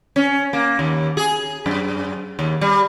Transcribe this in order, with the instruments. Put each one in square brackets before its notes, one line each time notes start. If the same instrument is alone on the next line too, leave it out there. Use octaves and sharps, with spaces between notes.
[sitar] C#4
A#3
D#2
G#4
F#2
D#2
G3